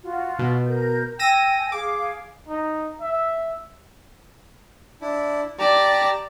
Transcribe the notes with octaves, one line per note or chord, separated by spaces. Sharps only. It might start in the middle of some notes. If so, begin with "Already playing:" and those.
F4 F#4
B2
A#4 G6
G5 G#5 E6 A#6 D#7
G#4 F5 D6
D#4
E5
D4 E4
G4 D5 A5 A#5